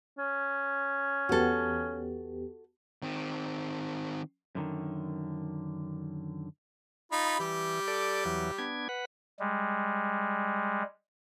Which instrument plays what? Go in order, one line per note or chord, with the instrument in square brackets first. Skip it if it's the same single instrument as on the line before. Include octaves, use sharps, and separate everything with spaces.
[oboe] C#4
[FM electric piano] E2 B3 G4 [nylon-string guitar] F#4 A4
[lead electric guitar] D#3 C4
[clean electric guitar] F#2 D3 D#3
[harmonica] D#4 F4 B5
[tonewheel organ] E3 [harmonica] G3 G4
[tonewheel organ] A4 D5
E2 E3 F#3
B3 D4 G#6
B4 F#5
[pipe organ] G3 G#3